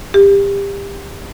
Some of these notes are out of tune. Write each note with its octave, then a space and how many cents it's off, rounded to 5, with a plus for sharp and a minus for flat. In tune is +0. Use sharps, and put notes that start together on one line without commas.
G4 +25